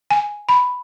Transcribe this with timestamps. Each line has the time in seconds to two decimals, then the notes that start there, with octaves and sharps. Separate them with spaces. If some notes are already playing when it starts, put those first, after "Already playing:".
0.11 G#5
0.49 B5